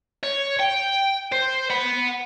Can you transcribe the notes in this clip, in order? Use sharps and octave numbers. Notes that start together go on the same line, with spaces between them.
C#5
G5
C5
F#5 B5